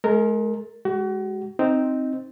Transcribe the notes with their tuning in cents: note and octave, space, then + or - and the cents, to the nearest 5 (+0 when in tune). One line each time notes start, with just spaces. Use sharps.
G#3 +35 A#4 -10
G#3 +0 F#4 +35
C4 +0 D#4 +0